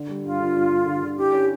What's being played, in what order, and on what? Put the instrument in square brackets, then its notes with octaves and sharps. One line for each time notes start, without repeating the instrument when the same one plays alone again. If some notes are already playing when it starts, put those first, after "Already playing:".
Already playing: [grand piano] D3
G3
[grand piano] G2 [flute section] F4
[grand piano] D3
G2
G2
D3
D3
[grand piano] E4 [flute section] G4
[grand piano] C#4